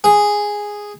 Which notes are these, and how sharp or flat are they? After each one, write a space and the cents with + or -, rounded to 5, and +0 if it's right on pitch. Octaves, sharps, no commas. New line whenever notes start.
G#4 -5